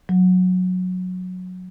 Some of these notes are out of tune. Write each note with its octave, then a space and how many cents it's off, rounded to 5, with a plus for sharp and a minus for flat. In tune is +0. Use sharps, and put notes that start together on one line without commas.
F#3 -15